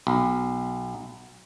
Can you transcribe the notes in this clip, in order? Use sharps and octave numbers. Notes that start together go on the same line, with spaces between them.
B1